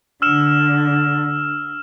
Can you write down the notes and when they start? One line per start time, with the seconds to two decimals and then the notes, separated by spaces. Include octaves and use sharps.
0.22 D3 E6 F6 E7